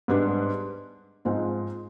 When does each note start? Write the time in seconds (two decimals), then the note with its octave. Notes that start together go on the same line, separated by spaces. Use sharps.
0.08 G#2 G3 B3 D4
1.25 G#2 F3 G#3 C4 D#4